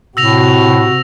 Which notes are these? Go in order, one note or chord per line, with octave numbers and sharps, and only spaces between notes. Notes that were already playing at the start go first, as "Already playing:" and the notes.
A2 C3 F#4 E6 A#6 F7